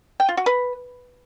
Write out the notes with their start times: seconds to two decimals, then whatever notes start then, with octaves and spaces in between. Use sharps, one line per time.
0.20 G5
0.29 F4
0.37 F#4
0.46 B4